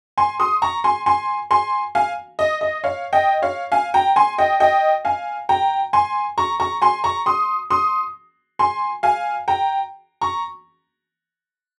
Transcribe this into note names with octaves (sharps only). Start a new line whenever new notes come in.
G#5 C6
C6 D#6
A#5 C#6
G#5 C6
G#5 C6
G#5 C6
F5 G#5
D#5
D#5
C#5 F5
D#5 G5
C#5 F5
F5 G#5
G5 A#5
G#5 C6
D#5 G5
D#5 G5
F5 G#5
G5 A#5
G#5 C6
A#5 C#6
A#5 C#6
G#5 C6
A#5 C#6
C6 D#6
C6 D#6
G#5 C6
F5 G#5
G5 A#5
A#5 C#6